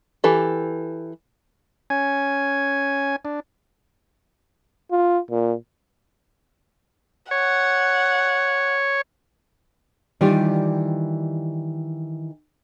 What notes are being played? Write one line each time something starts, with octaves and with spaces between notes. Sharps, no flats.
E3 G4 A4
C#4 G#5
D4
F4
A#2
C#5 F#5
D#3 E3 G3 F4 G4 D5